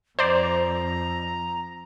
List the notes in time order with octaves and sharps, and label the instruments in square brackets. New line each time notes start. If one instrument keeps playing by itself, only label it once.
[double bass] F2 [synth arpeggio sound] C5 D5 [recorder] A#5